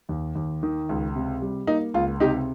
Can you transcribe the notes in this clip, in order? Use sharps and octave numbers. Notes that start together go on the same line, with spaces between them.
D#2
D#2
D#3
C#2
C3
G3
A#3 D#4
C#2 F4
C3 D#4 G4